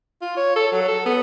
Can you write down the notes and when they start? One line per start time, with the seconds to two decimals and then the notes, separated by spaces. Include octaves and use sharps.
0.22 F4
0.37 C#5
0.56 A4
0.72 F#3
0.88 A4
1.06 B3